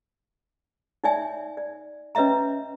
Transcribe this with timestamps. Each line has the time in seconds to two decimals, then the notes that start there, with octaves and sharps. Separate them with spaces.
1.04 D#4 C#5 D5 E5 G#5
1.57 D5
2.15 C#4 B4 C#5 D#5 E5 A#5